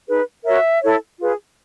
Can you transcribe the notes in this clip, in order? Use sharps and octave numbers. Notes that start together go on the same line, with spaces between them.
D#4 G#4 B4
F#4 A#4 C#5 E5
E4 A4 C#5
F4 G#4 B4